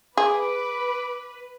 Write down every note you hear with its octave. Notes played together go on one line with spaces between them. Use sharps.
G#4 B4 D6